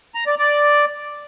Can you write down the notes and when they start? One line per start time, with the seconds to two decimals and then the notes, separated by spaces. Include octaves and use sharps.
0.15 A#5
0.27 D5
0.39 D5